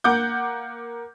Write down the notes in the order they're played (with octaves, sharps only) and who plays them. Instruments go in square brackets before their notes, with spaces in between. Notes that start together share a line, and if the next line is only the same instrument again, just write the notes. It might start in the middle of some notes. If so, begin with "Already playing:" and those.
[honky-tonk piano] A#3 F#5 D6 G6